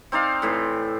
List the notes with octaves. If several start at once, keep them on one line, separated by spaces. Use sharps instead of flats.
C4 D#4 D5 F5
A2 E3 C4